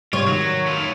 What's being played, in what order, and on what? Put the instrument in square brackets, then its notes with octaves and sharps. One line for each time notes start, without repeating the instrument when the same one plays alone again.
[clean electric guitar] C2 G#2 G3 [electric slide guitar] F4 [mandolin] C#5
[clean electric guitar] D#3 [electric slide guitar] F#3
[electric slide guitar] A3 F4